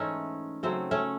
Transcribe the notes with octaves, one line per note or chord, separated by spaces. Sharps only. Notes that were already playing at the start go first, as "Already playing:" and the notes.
Already playing: G#2 E3 G#3 A3 C#4 D#4
C#3 F#3 A3 C4
A3 C#4